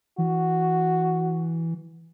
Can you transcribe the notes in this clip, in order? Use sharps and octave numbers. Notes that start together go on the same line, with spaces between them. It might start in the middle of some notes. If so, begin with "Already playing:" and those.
E3 F#4